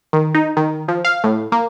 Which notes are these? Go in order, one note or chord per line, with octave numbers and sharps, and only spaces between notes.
D#3
D#4
D#3
F3
F5
A2
A#3